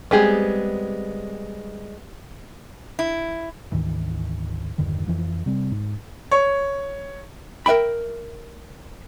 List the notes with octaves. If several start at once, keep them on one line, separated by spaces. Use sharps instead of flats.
G3 G#3 B3 C4 G4 G#4
E4
D2 G#2 D#3 E3
E2 G2 D3 D#3
F2 E3 F3
C3 G3 C4
G#2
C#5
A#4 B4 E5 G5 B5